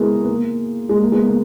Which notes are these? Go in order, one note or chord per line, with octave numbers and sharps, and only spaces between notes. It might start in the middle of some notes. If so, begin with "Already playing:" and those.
Already playing: G#3 B3 E4 F#4 G#4 A#4
B3
A#3
G#3
A#3
G#3 B3
A#3